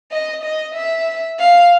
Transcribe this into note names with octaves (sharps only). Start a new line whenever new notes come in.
D#5
D#5
E5
F5